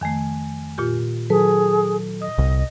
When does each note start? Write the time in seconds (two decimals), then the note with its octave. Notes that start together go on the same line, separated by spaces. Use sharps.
0.01 F2 D#3 A3 G#5
0.78 A#2 F4 G4
1.30 D#3 F#3 G#4 A4 B4
2.22 D#5 D#6
2.38 C2